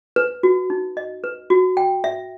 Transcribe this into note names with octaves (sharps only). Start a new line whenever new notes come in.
B4
F#4
D#4
D#5
B4
F#4
G5
E5